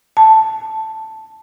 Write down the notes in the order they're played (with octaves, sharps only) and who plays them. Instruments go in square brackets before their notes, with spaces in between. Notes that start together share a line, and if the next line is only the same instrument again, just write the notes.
[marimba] A5